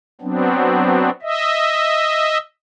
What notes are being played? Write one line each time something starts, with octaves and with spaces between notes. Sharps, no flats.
F#3 B3 C4 D4
D#5 E5